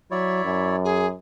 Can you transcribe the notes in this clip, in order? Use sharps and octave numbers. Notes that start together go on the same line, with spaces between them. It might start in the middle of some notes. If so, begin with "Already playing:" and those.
F#3 E4 C#5 D5 E5
F#2
G#4